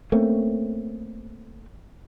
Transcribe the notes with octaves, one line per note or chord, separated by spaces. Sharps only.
A3 A#3 C4 C#4